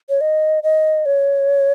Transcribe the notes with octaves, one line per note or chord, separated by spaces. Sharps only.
C#5
D#5
D#5
C#5